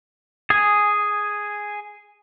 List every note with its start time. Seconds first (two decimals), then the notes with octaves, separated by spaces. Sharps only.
0.50 G#4 G#5